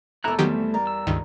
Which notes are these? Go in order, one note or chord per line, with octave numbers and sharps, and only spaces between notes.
E1 A3 A#3 E4 A4 A#5 E6 F#6
E2 D#3 F#3 G3 A3 C4 G4
A#4 D5
E6
C#2 G2 D#3